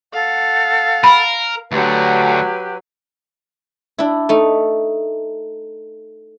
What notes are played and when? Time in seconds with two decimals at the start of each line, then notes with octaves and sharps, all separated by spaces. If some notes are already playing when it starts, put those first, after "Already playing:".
0.13 A4 F5 F#5
1.04 A#4 B5
1.72 D2 D3 F#3 G4 B4
3.98 D4 E4
4.29 A3 D#4